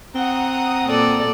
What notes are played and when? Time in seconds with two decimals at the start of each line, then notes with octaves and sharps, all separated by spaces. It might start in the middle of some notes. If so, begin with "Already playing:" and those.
0.15 C4 F#5 A#5 D#6
0.86 A#2 A4 D5